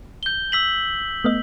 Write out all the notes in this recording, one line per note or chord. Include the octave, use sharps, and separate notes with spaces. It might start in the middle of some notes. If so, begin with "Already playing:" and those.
G6 G7
E6 B6 F#7
A3 B3 D#5